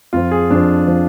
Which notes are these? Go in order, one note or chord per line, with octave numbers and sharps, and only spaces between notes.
F2 F3 F4
G#4
F2 F3 D4
F3